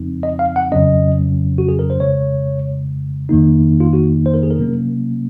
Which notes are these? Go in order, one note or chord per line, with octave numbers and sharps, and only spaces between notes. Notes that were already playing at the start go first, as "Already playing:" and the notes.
Already playing: F2 C#3 F3 C4 D#4
D#5
F5
F#5
F2 C#3 F#3 C#4 D#5
F#4
G#4
A#4
C5
F2 C#3 G#3 C#5
F2 D#3 A#3 D#4
F4
F#4
C5
A#4
G#4
A#4
C3 F#3 A#3 C#4